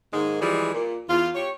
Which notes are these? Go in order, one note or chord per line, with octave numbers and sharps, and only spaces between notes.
G#2 D#3 G#3 A#3
E3 F3 G3 G#3 G#4
A#2
E2 F4
G4 C#5